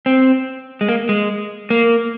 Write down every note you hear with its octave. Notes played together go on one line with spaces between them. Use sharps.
C4
G#3
A#3
G#3
A#3